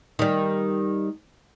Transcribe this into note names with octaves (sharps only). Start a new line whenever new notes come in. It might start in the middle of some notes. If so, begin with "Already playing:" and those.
D#3 G3